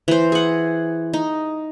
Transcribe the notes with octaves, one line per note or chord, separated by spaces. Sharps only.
E3 C5
G#4 F#5
D#4